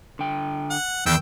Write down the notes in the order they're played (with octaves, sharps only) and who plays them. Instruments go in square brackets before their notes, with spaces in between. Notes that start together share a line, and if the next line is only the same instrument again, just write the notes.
[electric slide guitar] D3 G5
[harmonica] F#5
[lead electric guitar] E2 [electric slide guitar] D#3 [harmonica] G5 E6